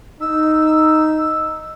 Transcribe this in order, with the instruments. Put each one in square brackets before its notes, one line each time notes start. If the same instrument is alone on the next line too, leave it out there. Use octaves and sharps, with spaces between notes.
[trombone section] D#4 [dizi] E6